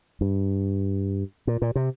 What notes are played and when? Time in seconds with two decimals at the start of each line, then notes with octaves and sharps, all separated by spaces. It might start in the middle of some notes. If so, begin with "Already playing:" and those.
0.21 G2
1.47 A#2
1.62 A#2
1.76 C3